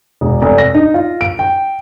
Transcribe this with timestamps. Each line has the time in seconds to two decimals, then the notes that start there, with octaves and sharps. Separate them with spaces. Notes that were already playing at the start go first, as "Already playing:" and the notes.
0.21 E1
0.42 F1
0.58 A#6
0.75 D#4
0.94 F4
1.21 D7
1.39 G5